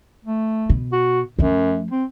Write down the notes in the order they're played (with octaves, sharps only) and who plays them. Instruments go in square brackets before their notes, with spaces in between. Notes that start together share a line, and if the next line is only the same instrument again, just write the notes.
[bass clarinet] A3
[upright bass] B2
[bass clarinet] F#4
[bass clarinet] F#2 [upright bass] F3 A3
[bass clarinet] C4